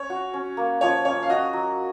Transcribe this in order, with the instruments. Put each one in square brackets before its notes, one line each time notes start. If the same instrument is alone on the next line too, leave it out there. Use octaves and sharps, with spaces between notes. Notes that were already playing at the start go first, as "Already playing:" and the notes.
Already playing: [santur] C#4 [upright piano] C#5
[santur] F#4
C#4
A#3
[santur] F3 [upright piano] C#5
[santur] C#4 [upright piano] C#5
[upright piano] F5
[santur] F#4 [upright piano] D#5
[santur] F#3